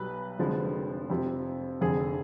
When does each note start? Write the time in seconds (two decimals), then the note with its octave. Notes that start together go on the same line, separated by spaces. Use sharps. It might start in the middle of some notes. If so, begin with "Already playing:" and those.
Already playing: B1 B2 G3 B4
0.39 F1 F2 D3 F3 G#3
1.10 F2 C3 F3
1.81 F1 F2 D3 G#4